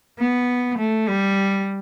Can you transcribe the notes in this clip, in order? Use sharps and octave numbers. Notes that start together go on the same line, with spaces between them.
B3
A3
G3